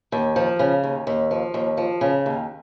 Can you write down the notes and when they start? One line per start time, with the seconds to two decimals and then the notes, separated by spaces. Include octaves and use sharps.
0.12 D#2
0.36 F3
0.59 C#3
0.83 D#2
1.07 D#2
1.31 F3
1.54 D#2
1.77 F3
2.01 C#3
2.26 D#2